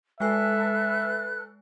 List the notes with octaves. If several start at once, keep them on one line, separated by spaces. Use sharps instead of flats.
G#3 A4 B4 E5 G#5 F#6 C7